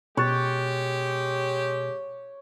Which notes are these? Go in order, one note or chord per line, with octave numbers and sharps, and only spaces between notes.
B2 G#3 G4 C#5 F#6 A6